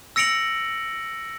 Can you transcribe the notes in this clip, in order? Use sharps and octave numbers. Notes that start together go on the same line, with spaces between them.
E6 A#6 C#7 D7 F7 F#7